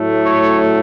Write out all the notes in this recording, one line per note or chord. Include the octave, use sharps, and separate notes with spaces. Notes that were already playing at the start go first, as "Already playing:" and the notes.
Already playing: A2 F#3 A3
C#5